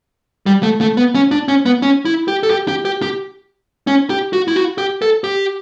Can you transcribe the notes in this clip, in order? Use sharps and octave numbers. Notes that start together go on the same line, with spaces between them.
G3
A3
A3
B3
C#4
D4
C#4
B3
C#4
E4
G4
A4
G4
G4
G4
G4
C#4
G4
F#4
E4
F#4
G4
A4
G4